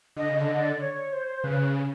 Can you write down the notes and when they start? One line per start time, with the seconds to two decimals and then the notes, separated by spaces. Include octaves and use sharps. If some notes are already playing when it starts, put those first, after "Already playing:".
0.17 D3 D#5
0.29 C#3
0.39 D3 D#5
0.59 D5
0.81 C#5
1.13 C5
1.44 C#3 B4